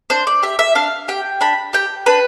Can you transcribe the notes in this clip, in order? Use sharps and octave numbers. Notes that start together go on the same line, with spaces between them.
D4 C5
D5
G4 E5
E5
D4 F5
G4 G5
D4 B5
G4 G5
D4 B4